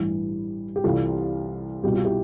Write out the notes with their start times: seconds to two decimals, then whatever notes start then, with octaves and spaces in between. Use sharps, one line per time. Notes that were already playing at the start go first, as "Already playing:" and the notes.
Already playing: A1 G2 E3 G3
0.76 G4
0.84 C2 C3 E3 G3 F4 A4
1.83 C2 B2 G3 G4
1.94 F4
2.05 E4 G4